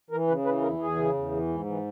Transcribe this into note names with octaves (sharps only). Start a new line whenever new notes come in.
E3 A#4
C#3 B4
E3 B4
E2 A#4
E2 G#4
C#3
E2
E3
G#2
E3